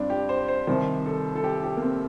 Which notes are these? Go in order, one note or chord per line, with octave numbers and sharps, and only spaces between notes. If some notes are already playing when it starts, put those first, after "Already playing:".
Already playing: G2 C4 D4
G4
C5
C5
C2 C3 D#3 C5
A4
A4
G4
G4
A#3
C4